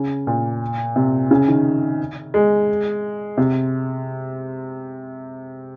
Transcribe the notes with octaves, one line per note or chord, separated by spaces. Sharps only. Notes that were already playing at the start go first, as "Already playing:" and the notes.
Already playing: C#3
A#2
C3
C#3
D#3
G#3
C3